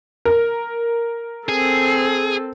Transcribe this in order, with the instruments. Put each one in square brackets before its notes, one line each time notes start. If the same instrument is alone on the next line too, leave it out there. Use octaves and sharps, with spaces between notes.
[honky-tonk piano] A#4
[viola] C4 A4 [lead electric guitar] G#4